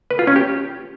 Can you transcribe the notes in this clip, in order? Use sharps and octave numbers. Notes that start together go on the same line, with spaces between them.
B4
F4
C#4
G4